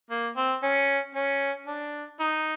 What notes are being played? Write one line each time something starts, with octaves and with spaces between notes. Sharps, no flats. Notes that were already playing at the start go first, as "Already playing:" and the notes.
A#3
C4
C#4
C#4
D4
D#4